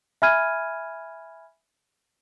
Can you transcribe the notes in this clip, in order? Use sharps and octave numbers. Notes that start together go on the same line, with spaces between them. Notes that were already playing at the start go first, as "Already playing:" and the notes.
E5 G#5 B5 F6 G#6 D#7